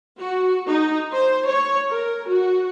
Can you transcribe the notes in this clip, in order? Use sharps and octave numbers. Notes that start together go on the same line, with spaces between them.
F#4
D#4
C5
C#5
A#4
F#4